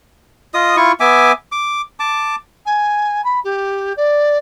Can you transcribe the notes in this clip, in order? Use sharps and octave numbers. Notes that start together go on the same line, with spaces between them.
F4 D#5 D#6
E4 F4 C#6
B3 E5 G#5 D6
D6
A5 D6
G#5
B5
G4
D5